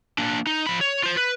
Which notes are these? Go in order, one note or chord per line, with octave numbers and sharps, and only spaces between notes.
A#3 D4
D#4
F3 B5
C#5
F4 C5
B4